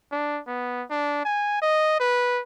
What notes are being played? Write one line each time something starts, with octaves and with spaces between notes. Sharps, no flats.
D4
B3
D4
G#5
D#5
B4